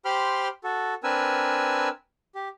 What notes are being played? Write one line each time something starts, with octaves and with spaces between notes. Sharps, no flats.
G4 C5 G5 B5 C6 F6
F#4 A4
C4 D4 A#4 B4 G#5 E6
G4